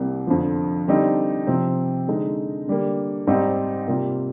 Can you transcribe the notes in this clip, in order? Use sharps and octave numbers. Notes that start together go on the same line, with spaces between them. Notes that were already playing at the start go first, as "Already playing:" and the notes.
Already playing: C2 C3 G3 A#3
F2 D3 F3
D3 G3 C4 D#4
C3 F3 C4
D3 G#3 D#4
D3 G3 A#3
G#2 G3 C4 D#4
C3 G3 A#3 F4